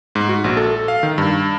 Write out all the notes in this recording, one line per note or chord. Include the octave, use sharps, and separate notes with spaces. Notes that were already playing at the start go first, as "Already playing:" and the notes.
G#2
F#4
A#1
A4
F5
D#3
G2